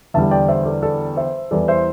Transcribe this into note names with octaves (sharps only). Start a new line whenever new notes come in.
E2 D3 G3 E5 A5
D5 G5
C5 E5
A4 D5
A4 D5
C5 E5
E2 E3 G3 A4 D5
C5 E5